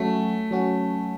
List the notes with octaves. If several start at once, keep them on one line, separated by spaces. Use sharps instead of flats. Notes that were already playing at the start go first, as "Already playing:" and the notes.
Already playing: F#3 A3 C#4 F#4
F#3 C#4 F#4